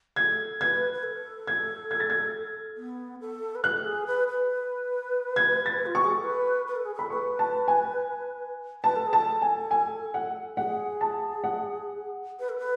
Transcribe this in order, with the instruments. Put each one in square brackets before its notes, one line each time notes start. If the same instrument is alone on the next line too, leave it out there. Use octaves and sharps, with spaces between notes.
[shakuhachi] A4 [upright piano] G#6
[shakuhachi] B4 [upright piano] G#6
[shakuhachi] B4
A4
[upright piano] G#6
G#6
A6
G#6
[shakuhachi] B3
A4
B4
[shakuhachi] A4 [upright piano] F#6
[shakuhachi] G#4
B4
B4
[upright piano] G#6
A6
[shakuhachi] F4
[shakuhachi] F#4 [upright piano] C#6
[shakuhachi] G#4
A4
B4
B4
A4
G#4
[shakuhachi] A4 [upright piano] B5
[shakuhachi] B4 [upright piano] C#6
[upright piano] A5
G#5
[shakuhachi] B4 [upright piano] A5
[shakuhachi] A4
G#4
[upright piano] A5
[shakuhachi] A4
[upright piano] G#5
G#5
F#5
[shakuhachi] G#4 [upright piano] F#5
[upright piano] A5
F#5
[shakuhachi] B4
A4
B4